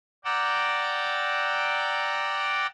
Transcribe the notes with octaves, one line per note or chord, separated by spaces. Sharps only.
D5 F#5 G5 A#5 D6 E6